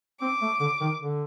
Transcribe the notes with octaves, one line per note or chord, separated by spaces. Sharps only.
C4 D6
A3
D3
D#3
D3